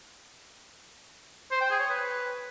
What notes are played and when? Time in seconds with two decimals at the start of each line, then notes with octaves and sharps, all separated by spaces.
1.51 C5
1.61 G5
1.70 G#4
1.80 C#5
1.89 B4